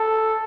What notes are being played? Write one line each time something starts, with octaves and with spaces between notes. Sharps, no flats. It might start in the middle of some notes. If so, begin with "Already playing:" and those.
Already playing: A4